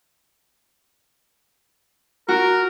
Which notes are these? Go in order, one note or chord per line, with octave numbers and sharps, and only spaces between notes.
F#4 A#4